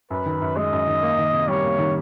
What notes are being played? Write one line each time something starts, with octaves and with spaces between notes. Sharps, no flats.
F#2 B4
D#3
F#2
G#3 D#5
F#2
D#3
A#3
D#3
C3
G3 C#5
A#3
D#3